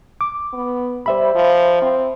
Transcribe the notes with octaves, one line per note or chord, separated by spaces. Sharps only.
D6
B3
G3 C5 E5 B5
F3
C4